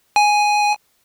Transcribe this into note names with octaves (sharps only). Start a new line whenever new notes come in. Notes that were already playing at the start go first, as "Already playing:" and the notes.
G#5